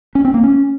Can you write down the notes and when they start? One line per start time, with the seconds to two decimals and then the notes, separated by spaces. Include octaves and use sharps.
0.15 C#4
0.25 C4
0.34 A#3
0.43 C#4